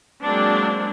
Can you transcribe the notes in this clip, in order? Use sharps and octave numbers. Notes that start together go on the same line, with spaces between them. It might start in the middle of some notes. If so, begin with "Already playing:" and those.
F#3 G#3 A#3 C4 D4